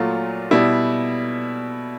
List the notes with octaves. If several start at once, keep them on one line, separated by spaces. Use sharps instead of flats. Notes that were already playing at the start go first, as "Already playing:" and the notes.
Already playing: A#2 F#3 A3 F4
B2 G3 E4